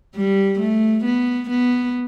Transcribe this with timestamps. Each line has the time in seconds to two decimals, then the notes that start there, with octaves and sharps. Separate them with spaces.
0.15 G3
0.60 A3
1.04 B3
1.50 B3